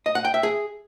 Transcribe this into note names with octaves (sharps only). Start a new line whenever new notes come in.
D#5
F#5
G5
E5
G#4